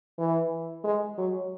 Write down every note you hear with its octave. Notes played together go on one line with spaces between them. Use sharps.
E3
G#3
F#3